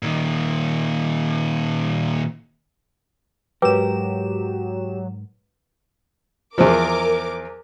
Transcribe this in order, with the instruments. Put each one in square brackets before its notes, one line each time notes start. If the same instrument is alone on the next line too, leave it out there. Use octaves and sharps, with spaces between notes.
[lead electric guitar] A#2 D#3
[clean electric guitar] G#2 A#4 [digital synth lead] F#3 [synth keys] G4 E7 [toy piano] B4
[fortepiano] E2 F3 [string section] A#4 D6